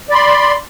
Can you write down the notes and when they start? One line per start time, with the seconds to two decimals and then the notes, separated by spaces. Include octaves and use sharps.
0.09 D5
0.12 B5
0.14 C6